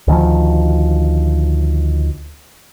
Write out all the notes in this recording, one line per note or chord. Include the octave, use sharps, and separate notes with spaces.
D2 D#3 F3